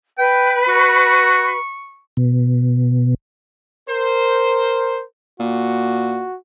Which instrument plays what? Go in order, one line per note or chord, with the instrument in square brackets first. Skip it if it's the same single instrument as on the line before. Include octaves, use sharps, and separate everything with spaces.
[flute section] B4 [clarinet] G5
[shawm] F#4 [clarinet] C#6
[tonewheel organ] B2
[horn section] A#4 C5
[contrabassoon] A#2 [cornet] F#4